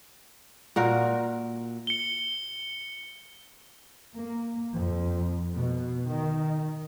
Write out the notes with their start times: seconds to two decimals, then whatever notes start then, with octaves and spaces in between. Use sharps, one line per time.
0.76 A#2 F#4 A#4
1.87 C#7 G7
4.15 A#3
4.72 F2
5.54 B2
6.08 D#3